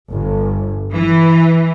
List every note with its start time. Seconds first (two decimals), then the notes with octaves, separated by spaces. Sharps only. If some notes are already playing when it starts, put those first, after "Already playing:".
0.11 G1
0.94 E3